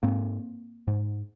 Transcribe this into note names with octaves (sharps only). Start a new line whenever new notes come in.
G#2 A#3 C4
G#2